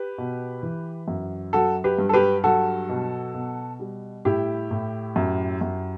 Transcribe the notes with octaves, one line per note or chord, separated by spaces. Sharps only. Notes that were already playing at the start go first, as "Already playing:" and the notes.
Already playing: G4 B4
B2
E3
F#2
F#3 F#4 A4
G4 B4
G2
A4
G4 B4
F#3 F#4 A4
B2
B2
G3
A2 E4 G4
A2
F#2
F#2